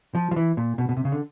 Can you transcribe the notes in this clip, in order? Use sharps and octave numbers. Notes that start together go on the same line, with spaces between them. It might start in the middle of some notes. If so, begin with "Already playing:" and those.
F3
F3
E3
A#2
B2
B2
C3
C#3
D3